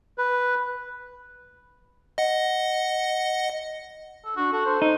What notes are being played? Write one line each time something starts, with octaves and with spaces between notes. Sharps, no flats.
B4
D#5 F#5
A4
D4 F#4
F#4 A4
C5
D#4 C5